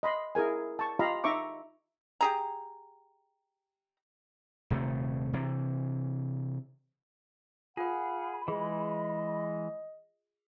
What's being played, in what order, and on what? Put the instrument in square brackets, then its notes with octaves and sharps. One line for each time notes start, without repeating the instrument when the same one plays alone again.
[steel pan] D#5 B5 C6
E4 G#4 A#4 G#5
A5 C#6
F4 G4 D#5 F5 A#5 B5
D#4 E5 A#5 C#6 D6
[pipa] G4 G#4 A#5
[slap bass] D#1 C3 A3
C3 E3
[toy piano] F4 A#4 [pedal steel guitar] G#4 [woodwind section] F5 F#5 [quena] B5
[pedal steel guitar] E3 G#3 [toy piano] G#4 [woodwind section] D#5